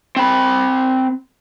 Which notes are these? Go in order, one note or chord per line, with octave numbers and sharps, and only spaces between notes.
C4 B5